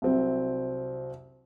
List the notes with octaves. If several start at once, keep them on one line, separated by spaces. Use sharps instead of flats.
C2 C3 F#3 C4